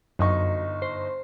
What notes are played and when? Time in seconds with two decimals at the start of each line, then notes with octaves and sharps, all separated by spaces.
0.19 G1 F#2 D#4 C#6
0.82 C5